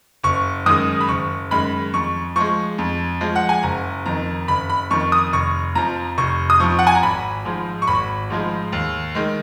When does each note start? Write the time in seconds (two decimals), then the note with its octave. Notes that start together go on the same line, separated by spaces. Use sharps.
0.24 F#1 C#6
0.66 F#2 D#3 G#3 D#6
1.00 B5
1.09 F#1 C#6
1.51 F#2 D#3 G#3 B5
1.94 F2 C#6
2.36 F3 G#3 C#6
2.78 F2
3.21 F3 G#3
3.36 F#5
3.49 G#5
3.63 F#1 A#5
4.06 F2 D#3 A#5
4.48 F#1 B5
4.70 B5
4.91 F2 D#3 C#6
5.12 D#6
5.33 F1 C#6
5.75 F2 F3 A#5
6.18 F1 C#6
6.50 D#6
6.60 F2 F3 C#6
6.79 F#5
6.87 G#5
6.95 A#5
7.03 G#1 B5
7.45 G#2 F3 G#3
7.82 C#6
7.87 G#1 B5
8.30 G#2 F3 G#3
8.72 D#2
9.15 D#3 G#3